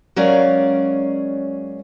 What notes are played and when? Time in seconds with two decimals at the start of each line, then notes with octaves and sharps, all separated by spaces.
0.16 F#3 G#3 C#4 A#4 D5 F5